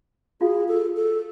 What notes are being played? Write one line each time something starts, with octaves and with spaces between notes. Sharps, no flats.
F4 F#4 G#4 F5
A4
A4